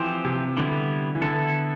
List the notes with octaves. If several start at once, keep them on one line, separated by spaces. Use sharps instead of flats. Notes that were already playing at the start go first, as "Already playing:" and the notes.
Already playing: E3 F3 C4 G4 C5
C3
D3 E3 G3 B3 E4
E3
D3 B3 E4 A4